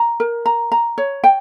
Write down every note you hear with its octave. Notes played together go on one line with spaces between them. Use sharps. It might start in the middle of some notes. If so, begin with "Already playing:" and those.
Already playing: A#5
A#4
A#5
A#5
C#5
G5